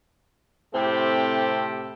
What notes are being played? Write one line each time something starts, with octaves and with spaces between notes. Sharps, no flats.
A2 C3 A3 C4 G4 A4